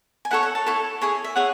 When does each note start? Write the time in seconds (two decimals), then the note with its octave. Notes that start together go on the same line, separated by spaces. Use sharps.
0.25 G#5
0.31 E4 A4 C#5 F#5
0.43 F#5
0.55 A5
0.66 E4 A4 C#5
1.01 E4 G#4 C#5
1.24 E5
1.36 E4 G#4 C#5 F#5